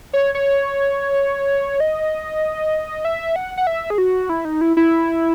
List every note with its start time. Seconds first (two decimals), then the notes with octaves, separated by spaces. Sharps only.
0.13 C#5
0.35 C#5
1.80 D#5
3.05 E5
3.36 F#5
3.57 F#5
3.67 E5
3.90 G#4
3.98 F#4
4.29 E4
4.45 D#4
4.61 E4
4.77 E4